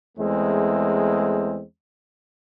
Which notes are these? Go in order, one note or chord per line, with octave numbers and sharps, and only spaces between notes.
E2 G#3 A3 C4